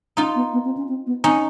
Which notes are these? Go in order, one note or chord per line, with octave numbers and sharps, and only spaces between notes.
C#4 D#4 F4
B3
B3
C4
C#4
C4
B3
C4 C#4 D#4